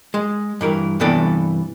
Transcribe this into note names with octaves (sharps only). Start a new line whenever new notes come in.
G#3
G2 E3 A#4
G2 C3 E3 B3 A4 D5